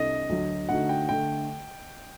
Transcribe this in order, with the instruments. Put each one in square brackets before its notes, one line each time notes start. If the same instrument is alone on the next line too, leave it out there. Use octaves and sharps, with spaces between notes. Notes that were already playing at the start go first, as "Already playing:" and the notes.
Already playing: [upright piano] C2 C3 G3 D4 A4 [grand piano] D#5
[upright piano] D2 D3 F#3
[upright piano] D3 A3 D#4 F#4 [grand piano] F#5
[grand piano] G5
[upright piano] D3 A3 [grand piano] G5